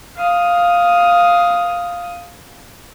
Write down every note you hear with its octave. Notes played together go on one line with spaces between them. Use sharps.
F5 D#6